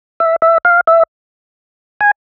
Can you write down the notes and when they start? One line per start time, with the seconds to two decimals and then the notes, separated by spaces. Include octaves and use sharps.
0.20 E5
0.42 E5
0.65 F5
0.87 E5
2.01 G#5